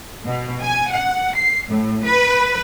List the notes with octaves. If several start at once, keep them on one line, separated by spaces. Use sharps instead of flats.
B2
G#5
F#5
C7
A2
B4